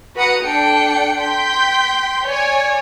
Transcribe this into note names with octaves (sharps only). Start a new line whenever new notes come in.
F#4 B4 F#5 A#5 D#6 C#7
D4 A4 G5 C#7
G5 C6 G6 B6
C#5 D5 G#5